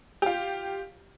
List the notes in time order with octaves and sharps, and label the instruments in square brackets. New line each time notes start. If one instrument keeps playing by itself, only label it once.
[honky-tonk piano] F4 G4